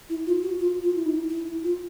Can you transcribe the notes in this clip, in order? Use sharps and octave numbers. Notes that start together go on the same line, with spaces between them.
E4
F4
F#4
F4
F4
E4
D#4
E4
F4